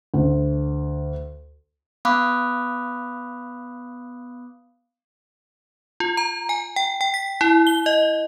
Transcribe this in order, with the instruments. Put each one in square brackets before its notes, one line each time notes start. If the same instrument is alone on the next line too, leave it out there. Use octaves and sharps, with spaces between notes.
[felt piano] D2
[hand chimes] B3 F5 B5 D6 D#6 F#6
[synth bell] F4
A#5
G#5
G5
G5
B6
E4
G7
D#5